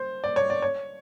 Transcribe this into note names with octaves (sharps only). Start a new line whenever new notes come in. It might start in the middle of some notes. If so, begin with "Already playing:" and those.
Already playing: C5
D5
C#5
D5
C#5